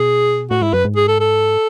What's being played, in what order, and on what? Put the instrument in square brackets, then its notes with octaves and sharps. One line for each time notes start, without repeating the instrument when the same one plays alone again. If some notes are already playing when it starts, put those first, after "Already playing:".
Already playing: [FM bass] B2 [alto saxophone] G#4
[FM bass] A2 [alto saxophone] F#4
[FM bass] G#2 [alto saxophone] E4
[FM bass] F#2 [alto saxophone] B4
[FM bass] G#2
[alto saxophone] G#4
A4
A4